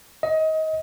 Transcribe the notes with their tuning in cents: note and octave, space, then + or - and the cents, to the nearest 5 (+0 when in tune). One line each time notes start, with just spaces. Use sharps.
D#5 +25